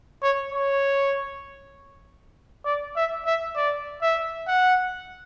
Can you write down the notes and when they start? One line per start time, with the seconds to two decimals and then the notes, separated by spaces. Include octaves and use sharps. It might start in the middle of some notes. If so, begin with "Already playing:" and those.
0.22 C#5
0.53 C#5
2.65 D5
2.96 E5
3.26 E5
3.56 D5
4.02 E5
4.47 F#5